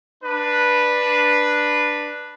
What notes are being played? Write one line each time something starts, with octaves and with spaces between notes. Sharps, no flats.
D4 B4